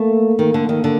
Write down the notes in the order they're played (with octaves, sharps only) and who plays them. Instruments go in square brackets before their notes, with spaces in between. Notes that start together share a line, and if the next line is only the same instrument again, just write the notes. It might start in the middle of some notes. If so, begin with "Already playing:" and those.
Already playing: [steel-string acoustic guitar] A3 [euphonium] A#3
[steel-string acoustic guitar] D#3 [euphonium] A#3
[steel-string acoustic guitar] D3
D#3
D3